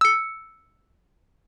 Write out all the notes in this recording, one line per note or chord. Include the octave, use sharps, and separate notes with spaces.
E6 C#7